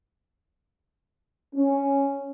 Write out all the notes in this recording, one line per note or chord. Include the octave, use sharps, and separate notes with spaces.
C#4